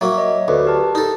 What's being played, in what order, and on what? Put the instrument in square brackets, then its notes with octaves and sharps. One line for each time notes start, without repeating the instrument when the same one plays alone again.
[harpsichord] F#3 A#3 [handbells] C#5 E5
[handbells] C#5 D#5
[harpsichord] D2 [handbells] B4
[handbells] G4 A#4 A5
[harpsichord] D#4 A4